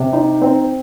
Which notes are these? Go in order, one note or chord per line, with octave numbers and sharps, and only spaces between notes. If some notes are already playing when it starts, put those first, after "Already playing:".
Already playing: C3
D#4
C4